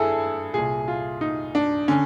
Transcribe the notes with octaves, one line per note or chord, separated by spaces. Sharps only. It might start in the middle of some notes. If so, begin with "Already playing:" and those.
Already playing: G2 E4 G#4 A4
C2 A#2 G#4
F4
D#4
D4
D3 C#4